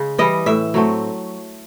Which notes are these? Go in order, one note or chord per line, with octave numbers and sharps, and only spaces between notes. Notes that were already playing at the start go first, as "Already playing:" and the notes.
Already playing: C#3 G#3
E3 G3 D#5
A2 E5
F#3 A3 C4